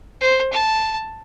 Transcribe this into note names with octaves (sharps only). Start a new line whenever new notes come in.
C5
A5